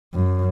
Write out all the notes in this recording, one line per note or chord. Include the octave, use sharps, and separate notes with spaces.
F#2